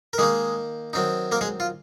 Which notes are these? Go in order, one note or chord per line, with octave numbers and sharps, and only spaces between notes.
A#4
D#3 G#3 A#3 D#4 G#4
D#3 F#3 C4 D#4
A#3 A#4
G#3 G#4
F4